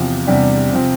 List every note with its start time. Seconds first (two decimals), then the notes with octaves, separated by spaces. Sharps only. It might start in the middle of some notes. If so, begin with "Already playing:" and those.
Already playing: E2 C3 F3
0.27 E2 C3 G3 D4
0.71 C3 F3 C4